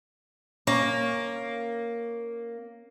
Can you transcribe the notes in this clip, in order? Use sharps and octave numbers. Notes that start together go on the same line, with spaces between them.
A#3 C#4